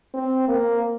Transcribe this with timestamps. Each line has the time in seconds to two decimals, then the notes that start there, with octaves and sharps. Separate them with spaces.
0.14 C4
0.49 A#3